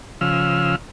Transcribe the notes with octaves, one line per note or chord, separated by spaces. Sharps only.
C#3 F3 E6 F6